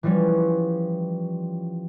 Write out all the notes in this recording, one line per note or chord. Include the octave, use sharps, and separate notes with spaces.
E3 F3 G3 C#4